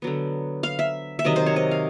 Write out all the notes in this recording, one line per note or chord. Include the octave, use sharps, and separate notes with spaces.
D3 F#3 B3
F5
E5
E5
C3 D#3 F#3 D#5
C5
C#5
D#5
F5